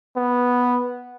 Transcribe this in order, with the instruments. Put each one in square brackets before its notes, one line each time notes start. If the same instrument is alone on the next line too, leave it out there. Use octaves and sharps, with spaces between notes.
[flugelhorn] B3